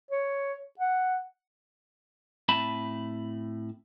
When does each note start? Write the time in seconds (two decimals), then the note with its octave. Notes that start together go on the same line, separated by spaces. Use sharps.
0.11 C#5
0.79 F#5
2.49 A2 C4 E5 A5 B5